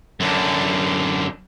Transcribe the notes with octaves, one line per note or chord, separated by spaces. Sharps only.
F#2 D3